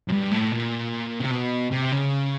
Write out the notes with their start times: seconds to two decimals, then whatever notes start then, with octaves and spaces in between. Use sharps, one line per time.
0.08 F#2
0.12 G2
0.31 A2
0.52 A#2
1.20 C3
1.31 B2
1.72 C3
1.92 C#3